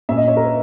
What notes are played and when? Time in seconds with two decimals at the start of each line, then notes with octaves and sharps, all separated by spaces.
0.09 A#2 A#3 C#4 E5
0.17 D#5
0.28 C#5
0.37 A#4
0.45 B4